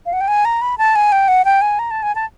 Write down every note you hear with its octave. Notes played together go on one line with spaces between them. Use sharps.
F5
F#5
G5
G#5
A#5
B5
A5
G#5
G5
F#5
G5
G#5
A#5
A5
G#5
A5